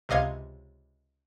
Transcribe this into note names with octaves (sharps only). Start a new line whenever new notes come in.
C#2 C3 D#5 F5 G#6